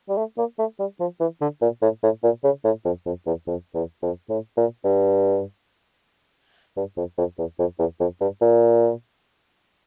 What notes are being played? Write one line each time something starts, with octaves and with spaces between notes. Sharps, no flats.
G3
A3
A#3
A3
G3
F3
E3
D3
A#2
A2
A2
A#2
C#3
A2
F2
F2
E2
F2
E2
F2
A2
A#2
G2
G2
F2
F2
E2
F2
E2
F2
G2
A#2